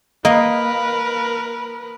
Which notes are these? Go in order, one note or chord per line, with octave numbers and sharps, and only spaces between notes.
A#3 A#4 B4 D#5